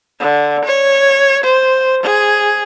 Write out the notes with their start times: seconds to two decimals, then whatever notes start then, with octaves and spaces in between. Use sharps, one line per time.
0.20 D3
0.65 C#5
1.44 C5
2.03 G#4